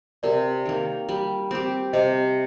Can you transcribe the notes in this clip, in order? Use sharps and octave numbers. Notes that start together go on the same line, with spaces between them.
C3 A#4 D5
D#3 A#3
G3
C4 G4
C3 C5 D#5